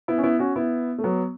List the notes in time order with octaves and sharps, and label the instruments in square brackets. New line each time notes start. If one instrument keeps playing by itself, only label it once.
[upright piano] B3 E4
C#4
B3 E4
C#4 F#4
B3 E4
A3
F#3 B3